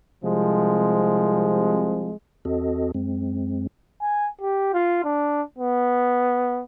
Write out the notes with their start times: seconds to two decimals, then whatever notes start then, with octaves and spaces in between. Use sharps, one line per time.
0.24 C2 C3 F3 G#3
2.45 E2 C4 F#4 A4 D#5
2.94 F#2 G#3 C4
4.02 G#5
4.41 G4
4.74 F4
5.04 D4
5.58 B3